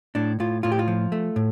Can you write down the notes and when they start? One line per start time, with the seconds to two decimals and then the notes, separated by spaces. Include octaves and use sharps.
0.15 A2 D4
0.40 A2 F4
0.63 A2 F4
0.72 G4
0.79 F4
0.88 F3
1.12 A3
1.36 A2